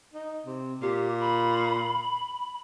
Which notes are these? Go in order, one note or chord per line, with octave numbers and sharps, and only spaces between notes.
D#4
C3
A#2 G4
B5